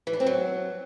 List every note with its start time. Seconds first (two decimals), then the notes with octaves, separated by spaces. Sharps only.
0.07 E3
0.13 D4
0.20 C4
0.27 F#3